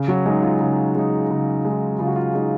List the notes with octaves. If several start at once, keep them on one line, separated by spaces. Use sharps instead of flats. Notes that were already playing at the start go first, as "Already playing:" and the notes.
Already playing: C#3
F#3 F#4
G#3 D#4
F4
C#3
G#3 D#4
C#3
G#3 D#4
C#3 F4
F#4
F4
G#3 D#4